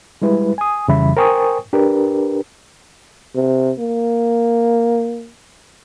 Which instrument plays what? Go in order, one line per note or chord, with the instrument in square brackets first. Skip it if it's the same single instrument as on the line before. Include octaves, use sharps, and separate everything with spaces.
[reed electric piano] G3 G#3 E4 B4
G#5 D#6
F2 C#3 E3 G3 E5 B5
A#4 C5 G5 G#5 C#6 D#6
D4 G4 A#4 B4
[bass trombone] C3
A#3